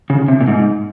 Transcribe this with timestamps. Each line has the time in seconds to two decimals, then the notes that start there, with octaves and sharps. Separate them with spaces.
0.10 C#3
0.28 C3
0.41 A#2
0.48 G#2